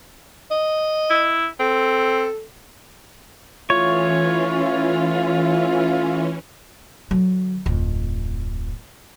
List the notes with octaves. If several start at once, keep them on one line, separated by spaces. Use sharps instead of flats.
D#5
E4
C4 A4
E3 A3 C#4 E4 F4 C#5
D3 F#3
D1 F2